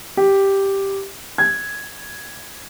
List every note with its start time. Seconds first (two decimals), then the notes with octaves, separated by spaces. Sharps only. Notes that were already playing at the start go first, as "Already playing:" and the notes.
0.17 G4
1.38 G#6